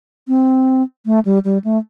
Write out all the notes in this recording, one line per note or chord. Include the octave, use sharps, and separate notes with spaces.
C4
A3
G3
G3
A3